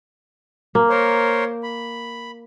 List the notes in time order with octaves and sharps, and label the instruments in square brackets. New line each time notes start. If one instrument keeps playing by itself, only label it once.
[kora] A#3
[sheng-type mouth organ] A#4 C5 C#5
B5